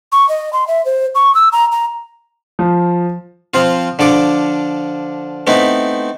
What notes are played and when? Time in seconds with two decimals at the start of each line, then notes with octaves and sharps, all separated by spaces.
0.12 C#6
0.29 D#5
0.53 C6
0.68 E5
0.85 C5
1.15 C#6
1.35 E6
1.52 A#5
1.72 A#5
2.59 F3
3.54 F3 C4 F4
3.99 D3 F3 A4 D6
5.47 A3 B3 C4 D#4 E4